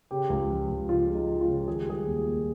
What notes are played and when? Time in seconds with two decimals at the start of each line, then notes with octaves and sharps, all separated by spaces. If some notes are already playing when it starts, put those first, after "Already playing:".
0.11 C#3 G4
0.30 C#2
0.50 F3
0.69 C#2
0.89 C#3 F4
1.09 G#3
1.15 D#4
1.29 F3
1.41 F4
1.48 C#3
1.67 D#3 G#4
1.79 G4
1.87 G3 G#4
2.07 D#2
2.26 A#3